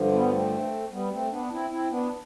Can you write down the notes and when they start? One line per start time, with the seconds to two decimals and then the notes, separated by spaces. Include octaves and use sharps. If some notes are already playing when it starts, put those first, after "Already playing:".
Already playing: G2 D3 F3
0.12 G3 B3
0.32 A3 C4
0.92 G3 B3
1.11 A3 C4
1.31 B3 D4
1.51 C4 E4
1.70 C4 E4
1.91 B3 D4